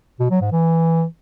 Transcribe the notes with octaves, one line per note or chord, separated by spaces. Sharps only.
B2
F#3
G#2
E3